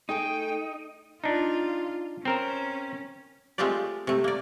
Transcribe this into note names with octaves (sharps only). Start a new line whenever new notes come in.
A3 D#4 G#4 A4 G5
D4 D#4 F4
C4 C#4 A#4 C5
G#3 A3 C4 F4 G4 D5
C3 A3
A#3 D5